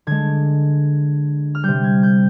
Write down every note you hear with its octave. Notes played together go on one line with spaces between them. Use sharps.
D3 G#3 G#6
F6
C3 G3 G6
G#6
G6